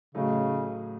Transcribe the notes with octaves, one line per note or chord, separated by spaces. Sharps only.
A2 C#3 F#3 A3 D#4